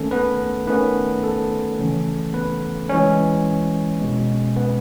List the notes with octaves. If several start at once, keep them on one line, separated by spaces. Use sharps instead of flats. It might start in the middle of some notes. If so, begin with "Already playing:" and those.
Already playing: D#3 A3 C#4 A4
B3 B4
D#3 A3 B3 C#4 B4
A4
C#3 E3 A3 C#4
B3 B4
E3 G#3 C#4 C#5
B2 G#3 B3
B3 B4